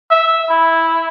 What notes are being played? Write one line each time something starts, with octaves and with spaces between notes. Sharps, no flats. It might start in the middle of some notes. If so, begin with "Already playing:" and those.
E5
E4